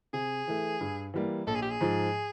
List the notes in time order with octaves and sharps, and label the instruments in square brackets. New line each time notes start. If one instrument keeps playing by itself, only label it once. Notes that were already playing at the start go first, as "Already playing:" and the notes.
[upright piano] C3 [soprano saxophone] G#4
[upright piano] E3 A3
G2
E3 G3 A#3
[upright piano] A#1 [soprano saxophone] A4
[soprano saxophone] G#4
G4
G#4
[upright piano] G#2 F3